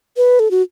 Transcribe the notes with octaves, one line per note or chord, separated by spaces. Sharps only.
B4
A4
F#4